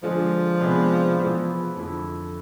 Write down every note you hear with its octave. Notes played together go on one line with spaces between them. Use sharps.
D3 F3 G#3 D4 F4 G#4
C3 G#3 B3 D4 G#4
E3 B3 E4 G#4
F2 D3 F3 A3 E4